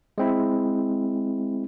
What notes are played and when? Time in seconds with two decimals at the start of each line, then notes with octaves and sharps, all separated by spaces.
0.18 G#3 C4 E4